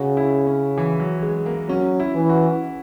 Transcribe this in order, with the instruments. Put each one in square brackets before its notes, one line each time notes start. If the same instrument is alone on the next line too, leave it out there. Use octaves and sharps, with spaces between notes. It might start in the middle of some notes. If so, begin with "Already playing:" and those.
Already playing: [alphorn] C#3 [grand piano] F#4
[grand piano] E4
C#4
E3
F#3
G#3
A#3
[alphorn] F#3 [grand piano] C#4
[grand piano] E4
[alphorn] E3
[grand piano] F#4